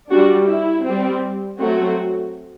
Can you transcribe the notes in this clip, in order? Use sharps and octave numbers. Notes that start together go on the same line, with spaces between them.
G3 D4 F#4
E4
G3 C4
F#3 A3 C4 F#4